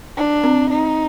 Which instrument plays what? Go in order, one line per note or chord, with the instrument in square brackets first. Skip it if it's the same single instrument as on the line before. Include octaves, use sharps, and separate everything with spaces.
[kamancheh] D4
[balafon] C4
[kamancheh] D#4